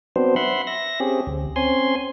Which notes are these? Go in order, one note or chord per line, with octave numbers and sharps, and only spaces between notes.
F#3 B3 C4 D4 C5
E5 F#5 B5 C6
E5 A#6
C4 C#4 G4 G#4
D2
C4 C#4 G#5 C6